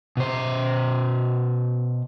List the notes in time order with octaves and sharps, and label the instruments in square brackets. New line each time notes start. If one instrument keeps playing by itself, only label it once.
[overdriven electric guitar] B2 C5